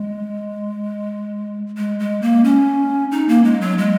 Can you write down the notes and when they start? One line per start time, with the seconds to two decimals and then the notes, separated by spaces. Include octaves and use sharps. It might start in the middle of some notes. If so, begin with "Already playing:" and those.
Already playing: G#3
1.77 G#3
2.00 G#3
2.22 A#3
2.44 C#4
3.11 D#4
3.28 A#3
3.44 G#3
3.61 F#3
3.78 G#3